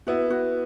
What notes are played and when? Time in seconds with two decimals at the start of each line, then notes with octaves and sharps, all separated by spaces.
0.07 B3 E4 F#4
0.30 F#4